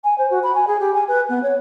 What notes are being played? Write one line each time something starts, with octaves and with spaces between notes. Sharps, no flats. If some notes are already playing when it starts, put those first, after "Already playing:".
G#5
C5
F#4
B5
G#5
G#4
G4
G#5
B4
B3
C#5